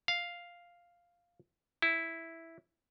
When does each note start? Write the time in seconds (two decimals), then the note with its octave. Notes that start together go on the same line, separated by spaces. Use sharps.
0.08 F5
1.82 E4